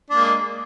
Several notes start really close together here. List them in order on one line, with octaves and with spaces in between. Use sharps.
D4 A#3 G#3